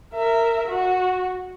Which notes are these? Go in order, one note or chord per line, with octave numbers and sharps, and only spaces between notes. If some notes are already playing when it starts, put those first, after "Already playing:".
A#4 E5
F#4